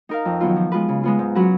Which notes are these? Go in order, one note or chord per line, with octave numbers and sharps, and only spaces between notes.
D#4 A#4 F5
F2
D#3 F#3 B3 F4
F3
G#3 B3 F4 B4
C#3
G#3 B3 F4
G#2
F#3 C#4 F#4 B4